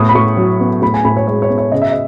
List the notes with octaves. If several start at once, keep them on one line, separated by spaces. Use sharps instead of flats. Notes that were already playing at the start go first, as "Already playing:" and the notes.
Already playing: A2 B3 D#6
B5
A2 C#6
F#3
B3
A2 B5
G#5
A2 B5
C#5
G#3 C#5
C#5
B3
C#5
C#3 D#5
E5
D#5